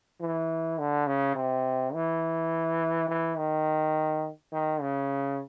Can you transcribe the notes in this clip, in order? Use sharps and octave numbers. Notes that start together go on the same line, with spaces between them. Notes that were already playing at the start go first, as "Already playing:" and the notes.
E3
D3
C#3
C3
E3
E3
D#3
D#3
C#3